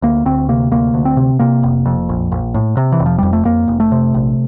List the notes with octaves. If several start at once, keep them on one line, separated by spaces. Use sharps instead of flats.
D2 A#3
D2 C4
C3 A#3
D2 A#3
D2
C4
C3
C3 A#3
F1
F2
A#1
A#1
A2
C3
E3
F1
F3
F2 G3
A3
F2 A#3
F1
A3
C3
A#1